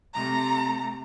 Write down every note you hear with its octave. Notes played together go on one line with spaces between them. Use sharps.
C3 A3 A#5